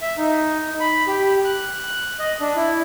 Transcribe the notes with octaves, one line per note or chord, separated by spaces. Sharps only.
E5
D#4
B5
G4
F#6
D#5
D4
E4